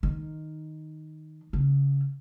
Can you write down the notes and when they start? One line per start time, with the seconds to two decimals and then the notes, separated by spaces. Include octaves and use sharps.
0.03 D#3
1.53 C#3